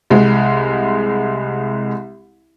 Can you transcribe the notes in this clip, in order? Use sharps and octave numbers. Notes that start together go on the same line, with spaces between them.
C2 G#3